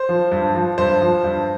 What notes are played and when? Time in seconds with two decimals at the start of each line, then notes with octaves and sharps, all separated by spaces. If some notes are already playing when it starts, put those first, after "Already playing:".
Already playing: C5
0.09 F3
0.32 G2
0.55 F3
0.78 G2 C5
1.01 F3
1.24 G2